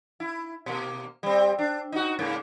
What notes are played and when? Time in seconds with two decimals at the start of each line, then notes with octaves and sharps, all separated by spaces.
0.20 E4
0.66 B2 A#3
1.23 G3 C4
1.59 D4
1.92 D#4 F#4
2.19 G#2 C#3 A#3